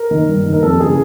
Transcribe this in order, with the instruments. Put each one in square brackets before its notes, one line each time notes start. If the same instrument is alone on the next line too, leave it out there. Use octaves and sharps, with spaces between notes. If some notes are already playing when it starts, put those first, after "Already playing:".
Already playing: [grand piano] A#4
D#3
G2
D#3
A#4
F2 A4
C#3 E3 G#4